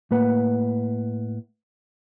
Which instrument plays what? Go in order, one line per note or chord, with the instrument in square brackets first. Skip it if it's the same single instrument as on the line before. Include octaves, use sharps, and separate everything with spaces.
[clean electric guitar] A2 A#3 B4 F#5